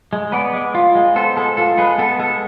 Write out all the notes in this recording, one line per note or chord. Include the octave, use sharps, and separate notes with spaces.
G#3
B3 B4 D5
G#3
F4
G#3
B3 A4 C5
G#3 A4
F4 A4
G#3 G#4 B4
B3 A4
G#3 A4